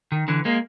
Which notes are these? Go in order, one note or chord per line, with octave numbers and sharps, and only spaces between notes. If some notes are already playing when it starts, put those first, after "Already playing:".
D#3
D3 E3
G#3 A#3